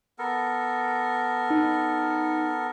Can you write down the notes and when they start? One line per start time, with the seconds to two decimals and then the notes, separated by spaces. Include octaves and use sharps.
0.19 B3 A4 A#4
1.50 D#4